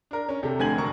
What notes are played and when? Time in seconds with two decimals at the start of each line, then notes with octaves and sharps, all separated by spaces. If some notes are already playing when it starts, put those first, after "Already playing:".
0.11 D4 A#4
0.29 C#4
0.43 C3 G4 A4
0.59 F1 D3 C4 G#5 G#6 F#7
0.78 E1 A#4 A5 C#6